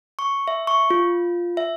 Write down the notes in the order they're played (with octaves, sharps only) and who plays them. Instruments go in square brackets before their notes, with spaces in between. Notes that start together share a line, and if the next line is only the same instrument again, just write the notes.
[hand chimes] C#6
E5
C#6
F4
E5